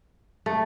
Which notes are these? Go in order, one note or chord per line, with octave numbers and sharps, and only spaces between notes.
A3